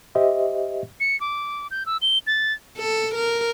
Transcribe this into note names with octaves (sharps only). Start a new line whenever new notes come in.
G4 C5 D#5 E5
C#7
D6
G6
E6
G7
A6
A4
A#4